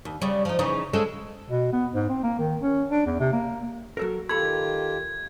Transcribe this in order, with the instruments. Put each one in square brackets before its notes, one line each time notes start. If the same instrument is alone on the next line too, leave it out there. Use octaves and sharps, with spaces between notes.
[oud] D#2
C#3 G3
F3 D#4
C#3 E3 D#4
C#3 G#3 A4
[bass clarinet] B2
B3
G#2
C4
A#3
D#3
C#4
D4
E2
C3
A#3
[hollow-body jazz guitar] F#3 A4 A#4
[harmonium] D#3 F4 G4 [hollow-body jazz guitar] A4 B5 [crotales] G#6